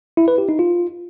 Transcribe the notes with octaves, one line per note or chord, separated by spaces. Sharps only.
E4
B4
G4
D#4
F4